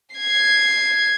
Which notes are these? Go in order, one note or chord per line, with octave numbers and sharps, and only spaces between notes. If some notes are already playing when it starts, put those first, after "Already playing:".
G#6 C7